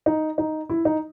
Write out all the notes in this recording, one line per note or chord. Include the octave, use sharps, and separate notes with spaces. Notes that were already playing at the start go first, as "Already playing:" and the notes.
D#4
D#4
E4
D#4